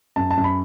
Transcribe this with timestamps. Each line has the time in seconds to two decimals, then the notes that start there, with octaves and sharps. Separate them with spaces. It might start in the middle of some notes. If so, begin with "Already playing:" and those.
0.16 F#2 A5
0.31 A5
0.37 F#2
0.44 B5